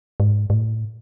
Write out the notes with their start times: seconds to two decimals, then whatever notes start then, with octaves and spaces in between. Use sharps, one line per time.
0.20 G#2
0.50 G#2
0.54 A2